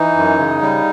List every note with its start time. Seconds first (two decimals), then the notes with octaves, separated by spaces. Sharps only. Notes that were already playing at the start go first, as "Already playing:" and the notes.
Already playing: E3 D#4
0.16 F#2
0.39 C#3
0.62 G3